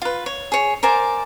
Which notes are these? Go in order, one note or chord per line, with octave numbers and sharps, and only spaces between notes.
F4 B4
C#5
G#4 C#5
A#4 C5 D5 G#5